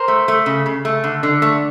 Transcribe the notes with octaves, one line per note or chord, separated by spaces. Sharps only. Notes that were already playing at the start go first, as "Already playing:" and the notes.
Already playing: A#4 C5
A3
A3
C#3
C#3
A3
D3
D3
A3